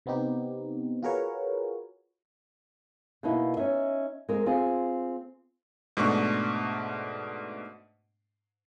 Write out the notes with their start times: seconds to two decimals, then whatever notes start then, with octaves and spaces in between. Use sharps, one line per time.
0.06 C3 B3 C4 D#4 G4
1.03 F4 F#4 G#4 A#4 B4 C#5
3.23 B2 A#3 D#4 E4
3.57 C#4 D#4 E5
4.29 G#3 C4 A#4
4.46 C4 F4 G#4
5.97 G#2 B2 A3 D4 C#6